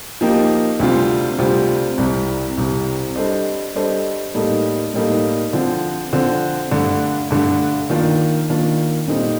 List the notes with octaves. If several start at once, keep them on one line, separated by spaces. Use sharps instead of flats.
F3 A#3 D#4 G4
D2 C3 G3 C4 F4
D2 C3 G3 C4 F4
C2 C3 G3
C2 C3 G3
G3 D4 A4 C5 D#5
G3 D4 A4 C5 D#5
A2 G3 A#3 D#4 A4
A2 G3 A#3 D#4 A4
D3 F3 C4
D3 F3 C4
G2 D3 A3
G2 D3 A3
D#3 A#3 D4 F4
D#3 A#3 D4 F4
A#2 G3 C4 D#4 A4